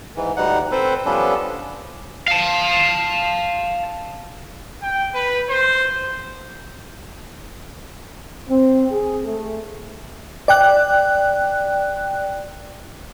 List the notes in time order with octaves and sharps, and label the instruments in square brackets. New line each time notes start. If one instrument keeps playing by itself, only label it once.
[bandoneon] G#2 E3
D2 G3 D#4 F#5
C4 A4 B4 C5
F3 G3 B3 C#4 D4 A4
[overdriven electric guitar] F5 A5
[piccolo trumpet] G5
B4
C5
[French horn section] C4
G#4
A3
[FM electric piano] D5 G5 F#6